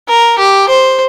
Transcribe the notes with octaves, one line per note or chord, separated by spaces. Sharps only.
A#4
G4
C5